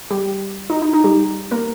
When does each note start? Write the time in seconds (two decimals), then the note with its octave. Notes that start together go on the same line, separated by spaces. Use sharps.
0.11 G3 G4
0.70 D#4
0.82 D#4
0.93 D#4
1.04 G3 G4
1.51 A#3 A#4